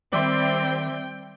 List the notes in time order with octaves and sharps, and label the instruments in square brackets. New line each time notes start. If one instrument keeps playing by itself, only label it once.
[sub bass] D#3 [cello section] G3 C4 [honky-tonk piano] D5 E5 C6 [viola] G5